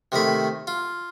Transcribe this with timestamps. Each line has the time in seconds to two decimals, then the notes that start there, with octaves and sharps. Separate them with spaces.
0.12 C3 D#3 A3 B5
0.67 F4